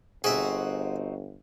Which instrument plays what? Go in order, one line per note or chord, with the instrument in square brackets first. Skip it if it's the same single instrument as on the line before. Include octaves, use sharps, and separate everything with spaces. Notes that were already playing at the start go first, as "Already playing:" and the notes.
[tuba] G1 [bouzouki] C4 D#4 F#4 [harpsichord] G#4 E5